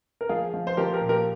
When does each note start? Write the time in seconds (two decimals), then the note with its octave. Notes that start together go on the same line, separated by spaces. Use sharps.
0.21 A#4
0.29 F3 F4 G#4
0.54 F3
0.67 C5
0.77 F3 G4 A#4
0.93 G4 A#4
1.01 A#2
1.09 G4 A#4